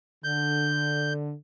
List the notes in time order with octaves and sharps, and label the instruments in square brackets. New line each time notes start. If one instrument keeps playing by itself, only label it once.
[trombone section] D3 [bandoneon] G6